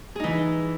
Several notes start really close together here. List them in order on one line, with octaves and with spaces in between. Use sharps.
G#4 D#4 E3